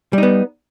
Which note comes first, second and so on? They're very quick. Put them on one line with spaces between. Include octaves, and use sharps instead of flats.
G3 D#4 B3